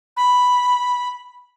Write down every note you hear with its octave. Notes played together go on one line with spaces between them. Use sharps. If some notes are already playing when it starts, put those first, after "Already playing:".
B5